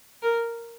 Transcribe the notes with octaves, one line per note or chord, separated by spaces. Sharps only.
A#4